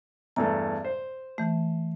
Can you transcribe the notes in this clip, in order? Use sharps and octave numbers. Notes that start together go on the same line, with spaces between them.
E2 G2 A3 A#5
C5
E3 A3